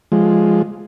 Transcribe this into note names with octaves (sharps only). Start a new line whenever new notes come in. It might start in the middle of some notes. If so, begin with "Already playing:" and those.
F3 G#3